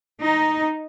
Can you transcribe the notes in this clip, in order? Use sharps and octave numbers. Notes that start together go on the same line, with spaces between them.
D#4